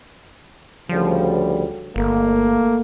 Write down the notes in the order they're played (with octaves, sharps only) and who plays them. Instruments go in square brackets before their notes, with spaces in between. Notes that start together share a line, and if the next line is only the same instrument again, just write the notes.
[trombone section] D2 C#3 G3 [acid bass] F3
[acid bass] G1 [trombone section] A3 A#3